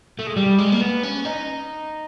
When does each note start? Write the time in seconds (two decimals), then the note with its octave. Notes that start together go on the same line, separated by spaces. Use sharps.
0.19 A3
0.27 G#3
0.36 G3
0.58 G#3
0.72 A#3
0.81 B3
1.03 C#4
1.25 D#4